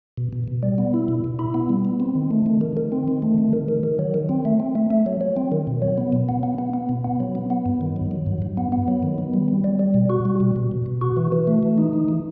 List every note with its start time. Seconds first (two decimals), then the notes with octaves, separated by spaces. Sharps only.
0.18 B2
0.33 B2
0.48 B2
0.63 G3
0.78 B3
0.94 E4
1.08 B2
1.24 B2
1.39 E4
1.54 B3
1.69 G3
1.85 B3
2.00 C4
2.15 D#3
2.31 A3
2.46 D#3
2.61 D#3
2.77 D#3
2.92 C4
3.08 D#3
3.22 A3
3.38 D#3
3.53 D#3
3.68 D#3
3.83 D#3
3.99 F#3
4.14 D#3
4.29 C4
4.45 A3
4.60 C4
4.75 A3
4.91 A3
5.06 F#3
5.21 F#3
5.37 C4
5.52 D#3
5.67 B2
5.82 F#3
5.98 B3
6.12 B2
6.29 B3
6.43 B3
6.58 B3
6.74 B3
6.89 B2
7.04 B3
7.20 F#3
7.35 B3
7.50 B3
7.66 G2
7.81 D#3
7.96 F#3
8.11 F#3
8.26 G2
8.42 G2
8.57 B3
8.72 B3
8.88 F#3
9.03 D#3
9.18 B3
9.34 G3
9.48 G3
9.64 G3
9.79 G3
9.94 B2
10.10 F#4
10.25 G3
10.40 B2
10.56 B2
10.71 B2
10.86 B2
11.01 F#4
11.17 E3
11.32 E3
11.47 A3
11.63 E3
11.78 D#4
11.93 E3
12.08 E3